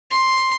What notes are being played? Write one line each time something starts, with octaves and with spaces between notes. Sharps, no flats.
C6